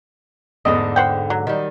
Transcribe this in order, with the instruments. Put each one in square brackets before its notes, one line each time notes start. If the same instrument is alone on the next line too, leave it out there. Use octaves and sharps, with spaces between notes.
[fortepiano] E2 D#5 [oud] G#2 D3
[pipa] C5 F#5 G5
F#3
[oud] D#3 G3